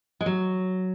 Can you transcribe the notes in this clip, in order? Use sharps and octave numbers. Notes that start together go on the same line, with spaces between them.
G#3
F#3